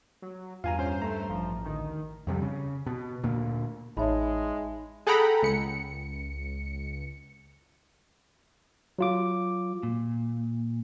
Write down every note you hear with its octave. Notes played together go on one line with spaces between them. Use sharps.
F#3
E2 G2 F4 F5 G#5 A#5
E2 C#4 C5
A3 A#5
A1 F3
D2 D#3
F2 C3 G3
C#3
B2
D2 A#2 A#3
A1 G#3 D#4 C#5 E5 A5 B5
G#4 A4 F#5 G5 A#5 B5
C#2 C#7
F#3 F4 D6
A#2